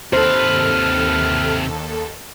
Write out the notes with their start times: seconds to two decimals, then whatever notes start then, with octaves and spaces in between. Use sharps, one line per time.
0.13 D#2 C3 A4 B4 C5 F6